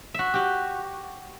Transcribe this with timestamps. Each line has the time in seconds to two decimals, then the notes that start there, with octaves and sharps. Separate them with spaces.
0.14 F#4 E5
0.34 F#4 G4